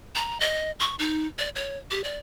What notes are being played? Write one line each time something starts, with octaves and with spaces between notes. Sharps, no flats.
A#5
D#5
C#6
D#4
D5
C#5
G4
D5